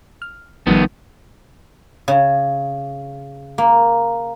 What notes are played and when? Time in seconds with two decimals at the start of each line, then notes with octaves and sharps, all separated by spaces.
0.22 F6
0.67 A1 D#3 F3 G3 B3
2.08 C#3
3.58 A#3